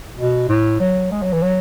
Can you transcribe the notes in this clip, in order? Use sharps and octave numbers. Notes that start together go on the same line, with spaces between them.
B2
A2
F#3
G#3
F#3
E3
F#3